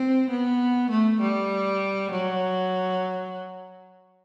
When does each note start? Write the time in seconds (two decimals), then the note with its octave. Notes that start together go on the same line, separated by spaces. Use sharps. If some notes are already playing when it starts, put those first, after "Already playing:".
Already playing: C4
0.30 B3
0.91 A3
1.21 G3
2.12 F#3